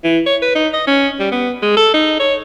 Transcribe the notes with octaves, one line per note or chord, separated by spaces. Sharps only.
E3
C#5
B4
D#4
D#5
C#4
G3
B3
G#3
A4
D#4
C#5